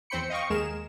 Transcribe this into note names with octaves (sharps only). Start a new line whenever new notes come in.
E2 C4 C5 G5 B5 C#7
D#5 F5 G5 C#6
D#2 G#3 G#4 A#4 E7